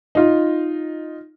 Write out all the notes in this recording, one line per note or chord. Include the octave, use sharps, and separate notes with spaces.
D#4 F4